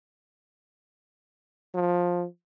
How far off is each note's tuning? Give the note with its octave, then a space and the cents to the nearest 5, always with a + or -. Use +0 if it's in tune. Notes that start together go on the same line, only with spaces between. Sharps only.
F3 +15